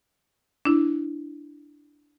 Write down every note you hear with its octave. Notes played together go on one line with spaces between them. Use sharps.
D4 E4